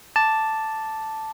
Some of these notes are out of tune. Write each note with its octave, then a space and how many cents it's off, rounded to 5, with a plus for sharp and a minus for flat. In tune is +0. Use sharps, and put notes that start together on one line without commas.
A5 +0 D6 +0